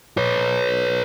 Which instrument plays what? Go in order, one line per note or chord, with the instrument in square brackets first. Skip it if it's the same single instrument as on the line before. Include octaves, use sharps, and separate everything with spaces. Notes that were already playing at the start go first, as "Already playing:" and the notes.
[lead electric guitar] B4 C#5